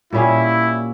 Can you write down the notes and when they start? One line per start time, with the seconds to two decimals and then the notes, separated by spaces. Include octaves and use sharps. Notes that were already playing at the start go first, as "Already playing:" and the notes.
0.13 A#2 G3 C#4 E4 G#4